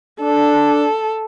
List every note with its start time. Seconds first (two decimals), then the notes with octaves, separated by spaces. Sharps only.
0.21 D4 A4